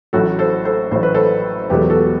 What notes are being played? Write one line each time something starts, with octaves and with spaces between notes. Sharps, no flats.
A1 A2 F#3 A3 F#4 A4
A4 C5
A4 C5
A1 A2 F#3 A3 C5
B4
A4 C5
E1 E2 B2 F#3 A3 G4 B4
F#4 A4